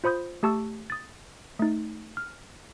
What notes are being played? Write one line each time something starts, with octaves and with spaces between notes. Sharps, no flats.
F4 C5 B5 D#6 G6
A3 G4 A5 C#6 E6
D#6 A6
A3 D#4
F6